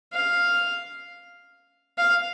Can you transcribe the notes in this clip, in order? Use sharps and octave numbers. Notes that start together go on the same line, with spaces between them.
F5
F5